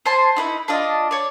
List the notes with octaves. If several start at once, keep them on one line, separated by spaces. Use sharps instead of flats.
C5 G#5 A5 C6
D#4 E4 B4
D4 F4 D#5
C#5 D5